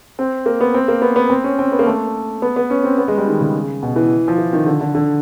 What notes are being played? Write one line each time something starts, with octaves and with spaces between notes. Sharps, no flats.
C4
A#3
B3
C4
A#3
B3
B3
C4
C#4
C4
B3
A#3
A3
B3
B3
C#4
C4
B3
G#3
G3
D#3
C#3
B2
E3
F3
E3
D#3
D3
D3
D3